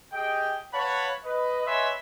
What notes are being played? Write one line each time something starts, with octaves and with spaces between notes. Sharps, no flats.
G4 G#4 D#5 G5
B4 C#5 F5 F#5 A5 B5
B4 D#5
B4 C#5 D#5 E5 G#5 C6